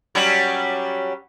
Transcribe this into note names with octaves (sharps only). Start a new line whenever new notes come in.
F#3 G3 C#4